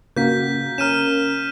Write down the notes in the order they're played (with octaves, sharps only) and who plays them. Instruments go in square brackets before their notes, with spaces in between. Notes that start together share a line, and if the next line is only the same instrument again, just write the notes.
[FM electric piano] C#3 F#4 [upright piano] A#3 [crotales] G6 B6
[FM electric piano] C#4 A#4 [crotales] F6 D#7 E7